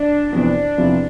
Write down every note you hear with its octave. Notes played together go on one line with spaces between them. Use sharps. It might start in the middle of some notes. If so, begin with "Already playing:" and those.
Already playing: D4
F2 C3 E3 B3 D4 E4
E2 C3 F3 C4 E4